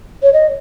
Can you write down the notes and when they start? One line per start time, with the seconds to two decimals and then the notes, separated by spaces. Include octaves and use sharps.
0.23 C#5
0.33 D#5